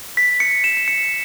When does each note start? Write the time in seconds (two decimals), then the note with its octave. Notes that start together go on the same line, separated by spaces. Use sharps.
0.17 B6
0.40 C#7
0.64 E7
0.77 E7
0.88 C#7